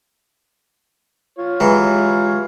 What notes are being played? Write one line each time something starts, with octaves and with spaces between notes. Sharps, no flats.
F4 C#5
E3 F#3 G#3 G4 B5